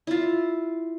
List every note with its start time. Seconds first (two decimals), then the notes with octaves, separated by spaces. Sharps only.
0.07 E4 F4